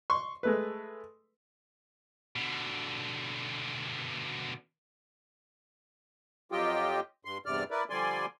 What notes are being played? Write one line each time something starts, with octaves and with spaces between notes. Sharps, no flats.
C6 C#6
G#3 A3 B4
B2 D3
F2 F#3 F4 G4 D#5 G5
G2 C6
E2 G2 C3 D5 F6
E4 A#4 B4 D5
D3 F3 G3 D5 G#5 C6